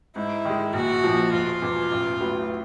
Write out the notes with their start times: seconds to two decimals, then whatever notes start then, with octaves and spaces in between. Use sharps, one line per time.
0.16 G#2 E4
0.45 D#3 G#3
0.74 A#1 F#4
1.04 A#2 F3
1.32 E1 F4
1.62 E2 B2
1.92 A1
2.20 A2 F#3 B3 E4